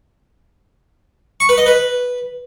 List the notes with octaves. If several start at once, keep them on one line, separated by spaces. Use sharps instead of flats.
C#6
B4
D#5
B4